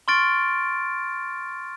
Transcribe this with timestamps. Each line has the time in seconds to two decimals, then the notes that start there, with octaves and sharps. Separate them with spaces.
0.08 C6 C#6 F6 A6 D7